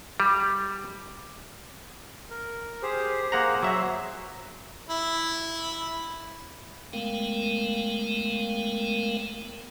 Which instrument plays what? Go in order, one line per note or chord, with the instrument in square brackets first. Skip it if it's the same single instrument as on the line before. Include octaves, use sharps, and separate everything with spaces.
[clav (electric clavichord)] G3
[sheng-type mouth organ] A#4
G4 G#4 C5
[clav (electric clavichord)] A#3 F#5 A#5 [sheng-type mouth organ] G#4 C5
[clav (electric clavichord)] F#3 E5
[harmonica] E4
[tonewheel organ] G#3 A3 B3 A#4 F5 G5